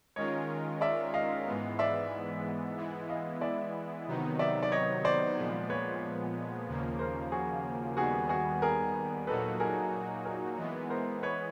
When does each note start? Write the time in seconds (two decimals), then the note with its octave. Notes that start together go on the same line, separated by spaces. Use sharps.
0.16 D#3 G#3 C#4 F4 A#4 C#5 D#5
0.81 D5 E5
1.14 D#5 F5
1.46 G#2 E3 G#3 B3
1.79 D5 E5
2.77 E3 G#3 B3 E4
3.09 D#5 F5
3.41 D5 E5
4.07 C3 D#3 F#3 B3 D#4
4.39 D5 E5
4.63 D5
4.72 C#5 D#5
5.05 C5 D5
5.37 A#2 F3 G#3 B3
5.70 B4 C#5
6.67 D#2 C#3 F3 A#3
6.99 A#4 C5
7.32 F#4 G#4
7.97 D#2 D#3 G3 B3 F#4 G#4
8.29 F#4 G#4
8.62 G#4 A#4
9.27 A#2 F#3 A#3 D#4 F#4 A4 B4
9.60 G#4 A#4
10.25 G#4 A#4
10.58 E3 G#3 B3
10.90 A#4 C5
11.23 B4 C#5